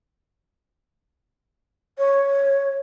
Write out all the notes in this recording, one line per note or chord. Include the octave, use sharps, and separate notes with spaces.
C#5